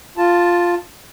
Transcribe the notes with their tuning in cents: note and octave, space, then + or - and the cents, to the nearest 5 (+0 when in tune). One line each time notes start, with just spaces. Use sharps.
F4 +0 A5 +0